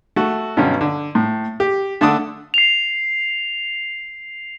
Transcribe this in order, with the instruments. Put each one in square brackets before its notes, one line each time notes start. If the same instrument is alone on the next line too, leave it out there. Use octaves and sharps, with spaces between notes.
[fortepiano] A3 F#4
G2 B2 D3 F#3 C#4
D3
A2
G4
D3 A3 D4 F#5 A5 D#6
[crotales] C7 F7